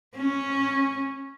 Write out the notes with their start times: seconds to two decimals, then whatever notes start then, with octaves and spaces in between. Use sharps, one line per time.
0.16 C#4